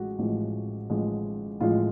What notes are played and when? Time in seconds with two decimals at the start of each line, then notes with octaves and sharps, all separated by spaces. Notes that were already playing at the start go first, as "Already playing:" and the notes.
Already playing: A1 A2 F3 G#3 F#4
0.19 A1 A2 F3 G#3
0.90 A1 A2 F3 G#3
1.60 A1 A2 F3 G#3 F4